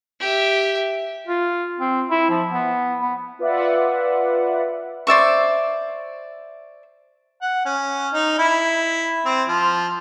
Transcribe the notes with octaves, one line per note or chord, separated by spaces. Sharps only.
G4 E5
F4
C4
E4
F3
B3
B3
F4 B4 D5 E5 F#5
C5 D5 E5 C#6
F#5
C#4
D#4
E4
C4
F3